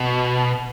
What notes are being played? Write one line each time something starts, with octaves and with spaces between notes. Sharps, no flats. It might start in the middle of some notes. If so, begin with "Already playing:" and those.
Already playing: B2